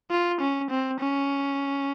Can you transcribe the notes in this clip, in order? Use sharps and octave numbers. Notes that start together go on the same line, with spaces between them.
F4
C#4
C4
C#4